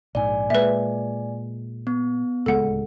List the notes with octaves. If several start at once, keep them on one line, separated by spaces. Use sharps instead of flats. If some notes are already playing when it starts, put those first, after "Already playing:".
A#1 G#2 D5 G#5
A#2 G#3 B4 E5
B3
D1 C#2 G#3 A4 F#5